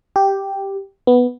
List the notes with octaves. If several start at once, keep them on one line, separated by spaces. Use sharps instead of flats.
G4
B3